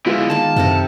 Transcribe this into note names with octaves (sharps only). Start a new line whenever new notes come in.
D3 G#3 B3 E4 F4
D#3 A#3 A5
F#2 C3 A4 A#4